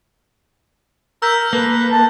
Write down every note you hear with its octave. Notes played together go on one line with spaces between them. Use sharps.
A#4 E6 G6 B6
A#3 A4 B4
A5